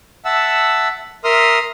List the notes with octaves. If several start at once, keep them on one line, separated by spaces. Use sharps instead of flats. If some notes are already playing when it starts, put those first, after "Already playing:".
E5 F#5 A5 E6
A#4 E5 C6 D#6 F6